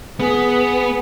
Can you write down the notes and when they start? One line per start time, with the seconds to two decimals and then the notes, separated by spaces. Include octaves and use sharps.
0.19 B3 G#4